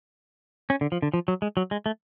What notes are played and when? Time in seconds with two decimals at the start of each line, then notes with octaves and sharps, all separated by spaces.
0.70 C#4
0.81 D3
0.92 F3
1.02 D3
1.14 F3
1.28 F#3
1.42 G#3
1.57 F#3
1.71 G#3
1.86 A3